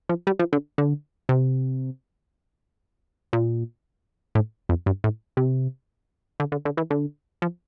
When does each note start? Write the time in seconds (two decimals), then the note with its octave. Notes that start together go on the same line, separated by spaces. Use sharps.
0.09 F3
0.27 G3
0.39 F3
0.53 D3
0.78 D3
1.29 C3
3.33 A#2
4.35 A2
4.69 F2
4.86 G2
5.04 A2
5.37 C3
6.40 D3
6.52 D3
6.65 D3
6.77 E3
6.91 D3
7.42 F3